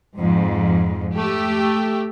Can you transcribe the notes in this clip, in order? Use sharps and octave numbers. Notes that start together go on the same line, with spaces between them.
F2 G#2
A3 G4